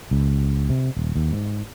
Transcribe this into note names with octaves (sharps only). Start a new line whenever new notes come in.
C#2
C3
D#1
D#2
G#2